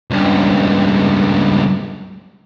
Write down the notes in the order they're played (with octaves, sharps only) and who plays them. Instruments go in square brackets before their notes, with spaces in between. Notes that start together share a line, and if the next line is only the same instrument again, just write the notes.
[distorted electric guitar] C#2 G2